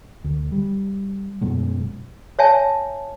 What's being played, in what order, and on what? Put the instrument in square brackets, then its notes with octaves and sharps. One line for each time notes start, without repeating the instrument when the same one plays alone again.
[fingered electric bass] D2
G3
F#2 B2 G#3
[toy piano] C#5 E5 G#5 A5